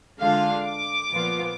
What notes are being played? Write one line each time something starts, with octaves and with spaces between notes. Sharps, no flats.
D3 G#3 D4 F4 F5
D6
A#2 F3 B3 F4